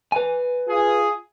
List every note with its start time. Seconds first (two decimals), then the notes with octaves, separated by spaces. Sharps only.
0.12 B4 G#5
0.68 F4 G#4